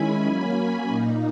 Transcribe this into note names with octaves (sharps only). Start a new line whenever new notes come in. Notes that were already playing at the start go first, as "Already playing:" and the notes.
Already playing: D#3 G#3 C#4 E4 G#5 B5
F#3 A#3 C#4
A#2 A#3 D#4